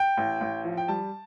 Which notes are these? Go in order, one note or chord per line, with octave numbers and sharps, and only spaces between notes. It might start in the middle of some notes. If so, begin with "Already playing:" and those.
Already playing: G5
A1
A1
F3
G5
G3 A5